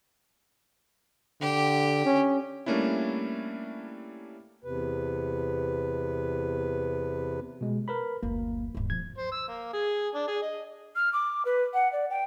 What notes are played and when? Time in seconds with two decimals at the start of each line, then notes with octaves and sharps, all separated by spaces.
1.41 D3 G4
2.05 C#4
2.66 G3 A3 A#3 C#4 D4 E4
4.64 E2 C3 B4
7.61 B2 G#3
7.88 A#4 B4 B5
8.23 F#1 D2 A#3
8.75 D1 G2
8.90 A#2 F3 G#6
9.18 C5
9.32 E6
9.48 A#3
9.73 G#4
10.14 D4
10.28 G#4
10.42 D#5
10.96 F6
11.13 D6
11.45 B4
11.74 F#5
11.93 D5
12.10 G5